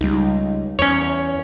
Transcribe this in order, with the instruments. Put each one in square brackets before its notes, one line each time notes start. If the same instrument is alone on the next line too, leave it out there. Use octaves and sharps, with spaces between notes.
[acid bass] C#2 [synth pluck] G3 D#4
[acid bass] E2 [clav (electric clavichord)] C#4 C#5